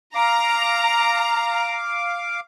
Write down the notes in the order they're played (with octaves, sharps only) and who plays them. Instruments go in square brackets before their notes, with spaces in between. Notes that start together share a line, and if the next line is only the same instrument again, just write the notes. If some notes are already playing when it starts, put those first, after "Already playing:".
[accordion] F5 D6 [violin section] A#5